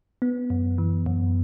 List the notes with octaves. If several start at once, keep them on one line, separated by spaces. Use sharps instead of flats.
B3
F#2
E3
F#2